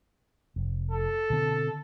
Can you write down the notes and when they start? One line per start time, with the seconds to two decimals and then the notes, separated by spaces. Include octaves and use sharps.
0.56 F1
0.91 A4
1.30 B2 D3 C4